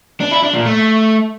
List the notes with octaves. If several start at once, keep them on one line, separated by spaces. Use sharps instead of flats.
D4
E4
D4
A#2
A3